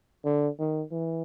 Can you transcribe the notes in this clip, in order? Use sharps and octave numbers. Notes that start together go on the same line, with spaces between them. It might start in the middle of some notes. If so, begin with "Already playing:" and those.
D3
D#3
E3